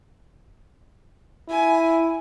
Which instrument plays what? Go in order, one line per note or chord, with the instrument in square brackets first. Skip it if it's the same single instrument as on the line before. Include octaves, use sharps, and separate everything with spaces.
[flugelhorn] E4 [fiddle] G#5